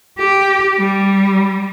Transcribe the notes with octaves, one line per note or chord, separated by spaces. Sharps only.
G4
G3